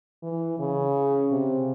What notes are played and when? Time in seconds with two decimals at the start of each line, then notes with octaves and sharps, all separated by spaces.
0.23 E3
0.59 C#3
1.32 C3